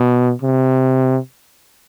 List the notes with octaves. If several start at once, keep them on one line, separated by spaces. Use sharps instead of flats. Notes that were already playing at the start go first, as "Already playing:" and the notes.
Already playing: B2
C3